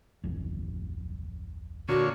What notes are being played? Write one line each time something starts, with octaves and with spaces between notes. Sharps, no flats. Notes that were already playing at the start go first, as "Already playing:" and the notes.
D1 G#1 F2
A#2 D3 F#4 C#5